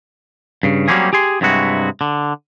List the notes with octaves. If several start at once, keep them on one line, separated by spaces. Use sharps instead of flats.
G2 C#3
F#3 G3 A#3 C4 C#4 G#4
G4 G#4 G#5 C6
G2 C3 F#3 G#3 E4 F#4
D3